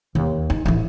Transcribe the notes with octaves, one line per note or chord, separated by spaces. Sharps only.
D#2
D#4
A1 E4